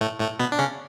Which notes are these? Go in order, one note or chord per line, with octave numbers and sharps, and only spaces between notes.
A2 A3
A2 A3
B2 B3
D4
C#3 C#4